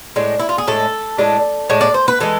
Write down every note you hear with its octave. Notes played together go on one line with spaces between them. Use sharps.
A2 G#3 D4
E4
F4
G#4
A2 G#3 D4 A4
A2 G#3 D4
A2 G#3 D4
D5
C5
B4
E3 G#3 A4